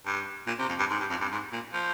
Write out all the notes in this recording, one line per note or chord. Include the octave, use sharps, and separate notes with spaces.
G2
A#2
C3
F2
G2
G#2
G2
F2
G2
G#2
A#2
F3